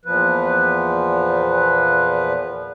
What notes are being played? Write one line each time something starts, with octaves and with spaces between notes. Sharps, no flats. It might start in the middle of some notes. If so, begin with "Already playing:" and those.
E2 A#2 F3 B4